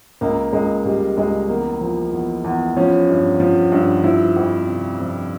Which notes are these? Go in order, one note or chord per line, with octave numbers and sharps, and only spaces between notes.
C#2 A#3
C#2 G#3
C#2 G3
C#2 G#3
E2 A#3
F3
E2
E2
F3 C#4
G2
F3
G2
F3 E4
F2
C3
F2